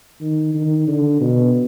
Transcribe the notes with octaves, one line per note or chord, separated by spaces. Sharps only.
D#3
D#3
D3
B2